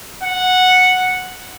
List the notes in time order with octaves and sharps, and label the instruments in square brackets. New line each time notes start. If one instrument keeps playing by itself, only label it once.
[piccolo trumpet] F#5